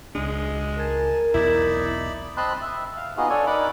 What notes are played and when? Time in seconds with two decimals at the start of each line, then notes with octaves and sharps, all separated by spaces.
0.15 C#2 G#3 D4
0.79 A#4 G#5 A5
1.34 B1 E2 D#4 E4 D5 B5
2.37 C4 D#5 A5 B5 C6 F#6
2.61 E5
2.97 F5
3.17 B3 D#4 F4 F#4 G#4 D#5
3.30 D4 A4 C#5 D5 G#5
3.46 D#4 A#4 D5 F#5 B5 D6